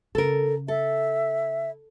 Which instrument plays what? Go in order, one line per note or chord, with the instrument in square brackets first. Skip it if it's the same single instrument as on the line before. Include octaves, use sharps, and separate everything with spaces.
[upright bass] C#3 [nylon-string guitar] A4 A#4
[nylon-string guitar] A4 [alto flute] E5